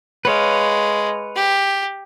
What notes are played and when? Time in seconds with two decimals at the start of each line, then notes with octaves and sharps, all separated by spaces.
0.25 G#3 B4 C#5 F5
1.36 G4